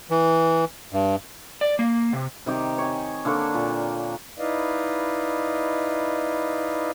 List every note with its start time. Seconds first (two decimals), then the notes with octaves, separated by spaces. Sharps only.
0.10 E3
0.93 G2
1.61 D5
1.79 A#3
2.13 C3
2.46 C3 D#3 G4 D5
2.78 C#5 G#5
3.25 D3 A#3 D4 C#5
3.54 A#2
4.39 D#4 E4 B4 D5 D#5 F5